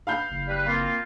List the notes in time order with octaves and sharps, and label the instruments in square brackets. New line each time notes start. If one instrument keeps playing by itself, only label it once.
[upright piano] F5 B5 G6
[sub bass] F#1
[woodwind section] G3 B4
A#3 C4 F4